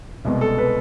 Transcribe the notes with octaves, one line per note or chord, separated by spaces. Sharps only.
C2 B2 G#3
A4
B4